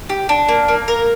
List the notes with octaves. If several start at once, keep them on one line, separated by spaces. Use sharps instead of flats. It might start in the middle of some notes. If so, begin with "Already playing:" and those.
G4
D4
A#3
A#3
A#4